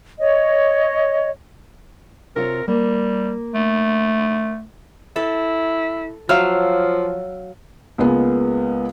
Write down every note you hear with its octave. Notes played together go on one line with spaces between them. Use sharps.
C#5 D#5
C3 F4 A#4 C#5
G3 A#3
A3
E4 A4
F3 F#3 F5 E6 F6
C#2 G#3 A#3 B3